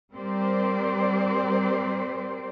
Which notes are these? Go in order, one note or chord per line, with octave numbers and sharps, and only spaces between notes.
G3 C4 G4 A#4 C5 D5